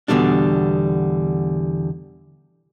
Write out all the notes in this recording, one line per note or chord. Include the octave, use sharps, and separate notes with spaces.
E2 B2 D3 G3 D4